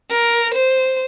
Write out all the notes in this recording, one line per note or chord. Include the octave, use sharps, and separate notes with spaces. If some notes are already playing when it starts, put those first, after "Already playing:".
A#4
C5